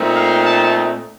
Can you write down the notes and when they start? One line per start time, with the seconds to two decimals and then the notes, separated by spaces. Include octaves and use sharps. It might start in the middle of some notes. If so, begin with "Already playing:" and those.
Already playing: A#2 A3 C4 D#4
0.16 F5
0.45 A5